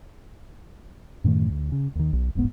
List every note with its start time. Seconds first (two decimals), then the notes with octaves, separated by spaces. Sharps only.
1.24 F#2 A2 D#3 A3
1.50 D2
1.72 C#3
1.95 D#2 D#3
2.13 B1
2.35 D#1 A1 G#2 B3